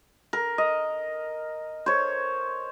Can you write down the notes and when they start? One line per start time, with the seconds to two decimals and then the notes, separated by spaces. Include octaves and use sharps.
0.33 A#4
0.58 D#5
1.86 C5 C#5